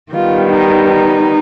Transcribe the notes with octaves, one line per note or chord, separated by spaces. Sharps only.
D#3 G3 B3 F4
D#4
D#4